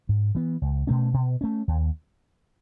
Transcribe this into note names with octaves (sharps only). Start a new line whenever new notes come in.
G#2
E3 B3
C#2
B2 A3 C#4
B2
A3 C#4
D#2